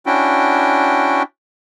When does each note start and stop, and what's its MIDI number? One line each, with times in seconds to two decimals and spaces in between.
0.06 1.23 61
0.06 1.23 62
0.06 1.23 64
0.06 1.23 66
0.06 1.23 79